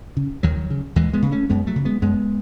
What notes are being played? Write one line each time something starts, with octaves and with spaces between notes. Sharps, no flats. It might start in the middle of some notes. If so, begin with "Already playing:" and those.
C#3
D#2 D#3 F#3
C#3
D#2 E3 G#3
G#3 B3
C#3
A3 C#4
F#2 G#3 B3
F#3 A3
C#3
G#3 B3
F#2 G#3 B3